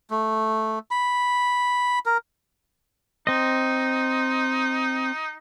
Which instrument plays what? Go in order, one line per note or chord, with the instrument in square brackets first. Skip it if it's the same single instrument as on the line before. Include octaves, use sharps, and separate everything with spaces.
[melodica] A3
B5
A#4
[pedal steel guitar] C4 D#5 [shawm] D#4